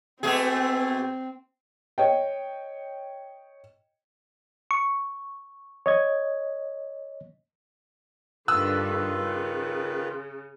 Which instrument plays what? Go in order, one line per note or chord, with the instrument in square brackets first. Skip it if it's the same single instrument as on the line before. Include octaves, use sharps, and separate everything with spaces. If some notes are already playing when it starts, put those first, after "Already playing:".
[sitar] B2 A3 G#4 [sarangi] C4
[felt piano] C#5 D#5 G5
[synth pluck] C#6
[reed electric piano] C#5 D#5 G#6
[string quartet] G2 D3 [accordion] D#3 F4 B4 [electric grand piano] D#6 E6 F#6
[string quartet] C#3